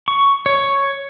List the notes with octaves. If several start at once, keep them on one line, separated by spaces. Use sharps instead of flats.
C#6
C#5